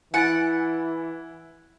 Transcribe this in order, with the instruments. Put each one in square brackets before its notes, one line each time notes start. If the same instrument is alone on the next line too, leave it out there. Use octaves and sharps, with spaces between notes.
[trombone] E3 [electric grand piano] E4 [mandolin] F#5 [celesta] G#5 A6 D7